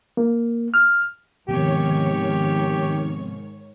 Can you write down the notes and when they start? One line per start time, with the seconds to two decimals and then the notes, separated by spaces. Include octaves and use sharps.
0.17 A#3
0.74 F6
1.48 G#2 C3 D#3 F3 B3 G4 C#5